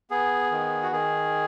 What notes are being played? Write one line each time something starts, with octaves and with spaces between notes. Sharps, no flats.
B3 G#4
D#3
F#4
D#3 G#4